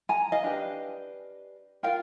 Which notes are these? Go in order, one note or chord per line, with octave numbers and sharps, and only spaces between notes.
G#5 A#5
D#5 F5
D4 G4 B4
F4 A#4 F5 G5